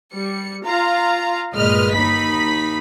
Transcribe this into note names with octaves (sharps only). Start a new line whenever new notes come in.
G3 C#7
F4 F5 A#5
G1 A#2 G#3 B4 D#5 F6
D#2 D#4 B5 B6